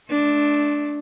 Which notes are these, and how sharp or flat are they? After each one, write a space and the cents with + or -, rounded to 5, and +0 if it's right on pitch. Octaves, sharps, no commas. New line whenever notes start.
A3 -20 D4 +0